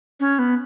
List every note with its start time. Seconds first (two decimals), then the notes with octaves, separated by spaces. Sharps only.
0.20 C#4
0.39 B3